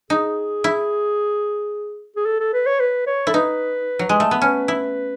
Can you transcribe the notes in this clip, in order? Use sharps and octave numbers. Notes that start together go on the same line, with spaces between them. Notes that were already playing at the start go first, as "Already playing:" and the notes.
D#4 G#4
E4
G#4
A4
A4
B4
C#5
B4
C#5
E4 A4
D#4 B4
F#3
G#3
A3
B3
C#4 B4
E4